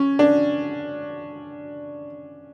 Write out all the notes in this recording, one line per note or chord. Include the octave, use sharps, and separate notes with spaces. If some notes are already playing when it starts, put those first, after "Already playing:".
Already playing: C#4
D4